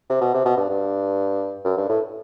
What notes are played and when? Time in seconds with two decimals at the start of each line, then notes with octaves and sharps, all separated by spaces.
0.10 C3
0.21 B2
0.34 C3
0.45 B2
0.57 G2
0.69 G2
1.65 F#2
1.78 G2
1.89 A2